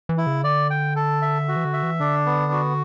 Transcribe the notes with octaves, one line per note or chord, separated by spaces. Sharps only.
E3
E4
C#3
D3 D5
G5
A4
E5
F#4
E3
D3
E5
E3
D3 D4
B3
F#4